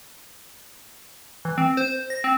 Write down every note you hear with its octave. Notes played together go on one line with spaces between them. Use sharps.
E3
C4
C5
A#6
C4